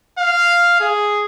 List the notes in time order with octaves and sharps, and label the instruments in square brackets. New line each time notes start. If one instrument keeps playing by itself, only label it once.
[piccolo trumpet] F5
G#4